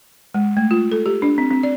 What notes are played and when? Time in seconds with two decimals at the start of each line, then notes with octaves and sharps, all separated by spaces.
0.34 G#3
0.57 A3
0.71 F4
0.92 A4
1.06 G4
1.22 D4
1.38 C4
1.51 C4
1.63 D5